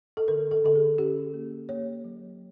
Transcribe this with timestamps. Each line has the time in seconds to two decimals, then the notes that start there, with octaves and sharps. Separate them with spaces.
0.17 A4
0.28 D3 A#4
0.51 A4
0.64 D3 A4
0.76 G#4
0.98 C#4 G4
1.34 A#3
1.69 A#3 C#5
2.04 F#3